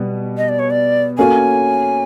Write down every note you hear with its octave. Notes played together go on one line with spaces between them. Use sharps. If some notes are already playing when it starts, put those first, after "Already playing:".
Already playing: B2 G3 B3
D#5
D5
C#5
D5
A#3 C#4 F#4 A4 C#5 G#5